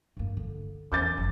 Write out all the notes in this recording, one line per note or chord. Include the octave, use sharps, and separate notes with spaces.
G2 A#3
D3
E2 D6 G6 A6
F#1 F2